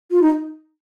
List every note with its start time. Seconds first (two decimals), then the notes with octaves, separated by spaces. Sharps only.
0.11 F4
0.22 D#4